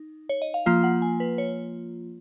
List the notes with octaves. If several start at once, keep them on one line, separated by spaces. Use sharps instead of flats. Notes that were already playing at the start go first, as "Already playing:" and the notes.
Already playing: D#4
C#5
D#5
F5
F3 A#3 F4 F5
F#5
G#5
B4
C#5